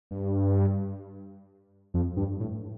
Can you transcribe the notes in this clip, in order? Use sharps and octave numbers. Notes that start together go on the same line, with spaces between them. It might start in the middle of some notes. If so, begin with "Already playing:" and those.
G2
F2
G2
A2